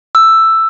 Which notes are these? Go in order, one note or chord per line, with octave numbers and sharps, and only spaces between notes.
E6